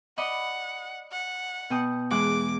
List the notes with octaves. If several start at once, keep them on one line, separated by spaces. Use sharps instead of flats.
D5 D#5 F#5 B5
F#5
B2 G5 D#6
E2 G#3 F#5 D6